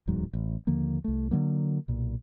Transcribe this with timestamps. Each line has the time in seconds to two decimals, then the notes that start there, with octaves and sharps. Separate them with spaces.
0.07 D1 E2 G#2 F#3
0.33 A1
0.67 D#2 D3 F3 A#3
1.04 C2 A3
1.31 D3 F3 F#3 A#3
1.88 B1 A#2